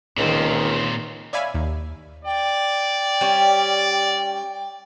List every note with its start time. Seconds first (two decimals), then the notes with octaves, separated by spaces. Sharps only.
0.18 C#2 A#2 D#3 C4
1.33 C#5 D5 E5 F5 G#5 B5
1.54 D#2
2.25 D5 G5
3.21 G3 C#4